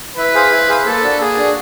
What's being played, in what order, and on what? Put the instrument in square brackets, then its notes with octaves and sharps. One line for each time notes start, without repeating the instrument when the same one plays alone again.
[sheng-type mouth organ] E4 [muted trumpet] B4
[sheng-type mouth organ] G#4 C5 F5
E4
G#4 C5 F5
[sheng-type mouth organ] A#3 [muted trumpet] A4
[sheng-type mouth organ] D4 F#4
[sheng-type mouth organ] A#3 [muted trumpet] G#4
[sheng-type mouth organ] D4 F#4